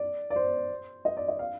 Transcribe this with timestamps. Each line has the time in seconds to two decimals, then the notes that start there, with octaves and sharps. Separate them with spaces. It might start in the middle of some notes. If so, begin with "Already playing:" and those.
Already playing: D5
0.30 D5
0.36 C5
1.05 D#5
1.17 D5
1.28 D#5
1.39 F5